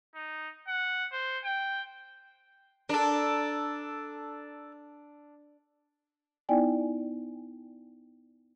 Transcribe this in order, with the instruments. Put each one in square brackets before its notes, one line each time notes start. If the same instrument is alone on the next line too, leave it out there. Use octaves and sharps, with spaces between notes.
[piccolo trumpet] D#4
F#5
C5
G5
[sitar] D4 [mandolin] A4 A#4
[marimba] B3 D#4 E4 D5 G5 G#5